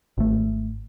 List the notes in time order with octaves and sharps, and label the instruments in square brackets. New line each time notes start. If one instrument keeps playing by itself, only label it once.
[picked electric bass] G#1 A3